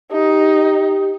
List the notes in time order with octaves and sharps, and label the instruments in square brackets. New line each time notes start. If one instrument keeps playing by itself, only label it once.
[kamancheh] D#4 [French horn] G4